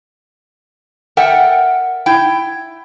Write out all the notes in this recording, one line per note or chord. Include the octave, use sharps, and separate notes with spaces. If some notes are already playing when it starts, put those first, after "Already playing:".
A4 A#4 E5 F#5 G5
E4 G5